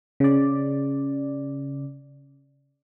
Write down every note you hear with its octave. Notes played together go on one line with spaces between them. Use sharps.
C#3 D5